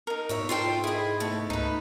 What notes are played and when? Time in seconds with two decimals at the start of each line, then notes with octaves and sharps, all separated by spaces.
0.07 D#4 A#4
0.29 G#2 B2 C#5 E5
0.49 F4 A4 C5 G5 C6
0.84 E4 G#4 B4 D#5
1.20 A3 B3
1.50 C#2 D#4 B4